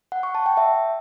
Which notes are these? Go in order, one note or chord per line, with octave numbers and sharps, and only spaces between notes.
F#5
C#6
A5
G5
E5